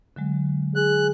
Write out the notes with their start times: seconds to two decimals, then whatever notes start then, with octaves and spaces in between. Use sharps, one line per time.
0.16 D3 F#3 G#3
0.76 G#4 F#6